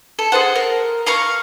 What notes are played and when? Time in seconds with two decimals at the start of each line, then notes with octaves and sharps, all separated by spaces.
0.19 A4
0.32 G#4 A4 C5 F#5
0.55 A#4
1.06 F5 A#5 C#6 F6